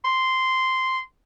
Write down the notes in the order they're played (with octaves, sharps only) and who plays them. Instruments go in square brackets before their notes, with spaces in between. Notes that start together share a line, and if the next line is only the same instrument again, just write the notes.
[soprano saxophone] C6